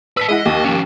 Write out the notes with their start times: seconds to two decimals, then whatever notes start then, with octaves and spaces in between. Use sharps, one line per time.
0.17 B4 A5 E6 B6
0.29 G#3 E4 D#5 F#5
0.45 D#2
0.65 F3 C#4